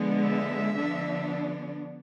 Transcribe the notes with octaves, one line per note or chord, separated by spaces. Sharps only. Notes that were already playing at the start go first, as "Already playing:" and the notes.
Already playing: D3 F3 G#3 B3
E5
D3 F3 B3 D4